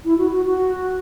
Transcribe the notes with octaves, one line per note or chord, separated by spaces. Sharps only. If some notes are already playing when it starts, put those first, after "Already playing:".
E4
F#4
F#4
F#4